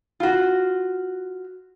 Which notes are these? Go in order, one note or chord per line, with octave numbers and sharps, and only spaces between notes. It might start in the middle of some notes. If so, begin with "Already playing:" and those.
F4 F#4